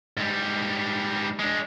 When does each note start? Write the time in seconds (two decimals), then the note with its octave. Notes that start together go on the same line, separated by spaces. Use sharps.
0.17 G#2 G3
1.39 G#3 D4